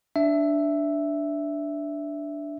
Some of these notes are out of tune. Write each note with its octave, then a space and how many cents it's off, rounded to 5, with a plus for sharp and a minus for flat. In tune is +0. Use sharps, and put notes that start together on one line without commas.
D4 +0 E5 +0